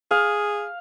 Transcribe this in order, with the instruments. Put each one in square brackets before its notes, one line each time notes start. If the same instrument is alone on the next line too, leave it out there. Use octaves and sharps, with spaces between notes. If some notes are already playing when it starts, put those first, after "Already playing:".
[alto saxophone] G#4 [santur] F5